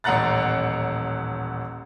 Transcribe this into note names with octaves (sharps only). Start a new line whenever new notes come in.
D#1 A1 F#5 A#5 F#6 A6